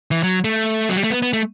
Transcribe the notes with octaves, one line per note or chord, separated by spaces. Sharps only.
E3
F#3
A3
F#3
G3
A3
B3
B3
A3